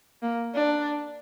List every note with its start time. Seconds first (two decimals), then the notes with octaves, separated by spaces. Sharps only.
0.22 A#3
0.55 D4